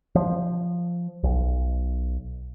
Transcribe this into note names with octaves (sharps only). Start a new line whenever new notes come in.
F3
B1